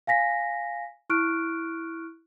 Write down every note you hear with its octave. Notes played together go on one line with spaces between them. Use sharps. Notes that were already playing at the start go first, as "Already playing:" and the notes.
F5 G#5 A#6 B6
E4 C#6 F6 F#6 D7